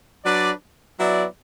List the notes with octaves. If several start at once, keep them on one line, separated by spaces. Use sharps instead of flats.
F#3 D4 B4 D5
F#3 B3 E4 D5